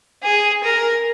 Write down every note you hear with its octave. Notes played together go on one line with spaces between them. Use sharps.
G#4
A#4